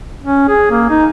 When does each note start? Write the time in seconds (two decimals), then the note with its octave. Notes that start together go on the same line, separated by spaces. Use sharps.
0.23 C#4
0.48 G#4
0.71 A#3
0.89 D#4